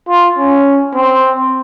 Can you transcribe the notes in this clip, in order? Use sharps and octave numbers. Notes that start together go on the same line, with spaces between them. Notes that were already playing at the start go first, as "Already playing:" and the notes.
F4
C#4
C4